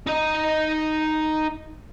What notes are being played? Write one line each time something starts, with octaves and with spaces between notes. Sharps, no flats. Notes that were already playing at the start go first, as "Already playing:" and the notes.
D#4 D#5